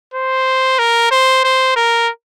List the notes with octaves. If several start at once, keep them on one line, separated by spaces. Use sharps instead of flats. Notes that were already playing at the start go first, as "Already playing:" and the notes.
C5
A#4
C5
C5
A#4